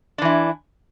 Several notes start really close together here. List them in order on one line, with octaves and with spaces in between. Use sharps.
D4 E3 E4